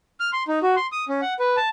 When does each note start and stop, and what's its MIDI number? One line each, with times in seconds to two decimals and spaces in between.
0.20 0.30 89
0.33 0.43 84
0.48 0.59 63
0.63 0.75 66
0.76 0.87 84
0.92 1.05 87
1.09 1.21 61
1.22 1.34 78
1.39 1.57 71
1.57 1.69 81